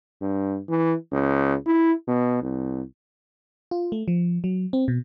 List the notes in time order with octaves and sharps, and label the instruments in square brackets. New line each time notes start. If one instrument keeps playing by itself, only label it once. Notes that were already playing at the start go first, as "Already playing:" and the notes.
[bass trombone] G2
E3
C#2
E4
B2
C2
[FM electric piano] F4
A3
F3
F#3
C4
B2